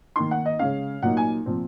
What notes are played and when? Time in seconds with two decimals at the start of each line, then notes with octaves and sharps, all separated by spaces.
0.16 D#3 A#3 D#4 C6
0.31 F#5
0.46 D#5
0.59 C#3 G#3 C#4 F5
1.02 A#2 F#3 A#3 D#4 F#5
1.17 G#5
1.46 A#2 F3 C4